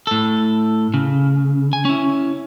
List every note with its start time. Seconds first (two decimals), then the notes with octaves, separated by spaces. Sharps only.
0.07 A2 A4
0.94 C#3
1.73 G#5
1.85 C#4 E4